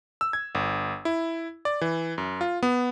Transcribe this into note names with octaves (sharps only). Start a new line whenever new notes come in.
E6
G#6
G1
E4
D5
E3
F#2
F4
B3